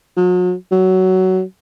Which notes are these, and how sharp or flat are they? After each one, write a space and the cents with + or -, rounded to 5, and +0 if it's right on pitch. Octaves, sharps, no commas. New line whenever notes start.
F#3 -40
F#3 +15